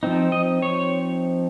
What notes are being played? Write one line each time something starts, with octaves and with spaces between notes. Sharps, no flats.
F3 C4 D#4
D#5
C#5